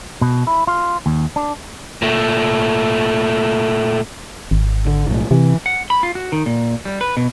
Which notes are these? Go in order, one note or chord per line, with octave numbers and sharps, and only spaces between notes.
B2
E4
F4
D#2
D4
A#2 A3
G#1
D3
B1 A2
C3 E3
F#5
B5
F4
F#4
D#3
A#2
G3
B4
B2